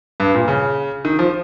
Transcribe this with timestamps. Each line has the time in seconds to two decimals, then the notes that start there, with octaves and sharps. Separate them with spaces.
0.20 G2
0.35 A#2
0.48 C#3
1.05 D#3
1.19 F3